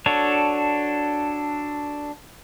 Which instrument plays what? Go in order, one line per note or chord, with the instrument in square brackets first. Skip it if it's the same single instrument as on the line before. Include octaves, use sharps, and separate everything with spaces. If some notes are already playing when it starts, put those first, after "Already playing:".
[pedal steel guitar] D4 F#4 A4 C#5